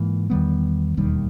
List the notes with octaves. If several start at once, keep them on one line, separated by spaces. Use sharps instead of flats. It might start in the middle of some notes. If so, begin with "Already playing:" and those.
Already playing: G#2 E3 A#3
E2 D#3 G3 B3
E1 D#2 D#3 G3